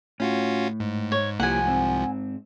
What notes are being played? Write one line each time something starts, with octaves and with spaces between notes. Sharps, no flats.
A2 C#4 F4 F#4
G#2
C#5
C2 F3 A#3 E4 G4 F#5 G#5
G#2 C4